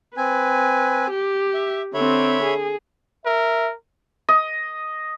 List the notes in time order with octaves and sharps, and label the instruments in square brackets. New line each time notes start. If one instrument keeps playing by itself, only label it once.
[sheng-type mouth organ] C4 G#5 [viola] B4
[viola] G4
[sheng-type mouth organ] E5
[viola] D3 C4 [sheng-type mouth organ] C#5 E5 B5
[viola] G#4
[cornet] A#4 [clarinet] E5
[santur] D#5